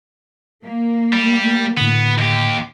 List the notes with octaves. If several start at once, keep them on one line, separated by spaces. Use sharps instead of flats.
A#3
G3
A2 D3 B3
D#2 G4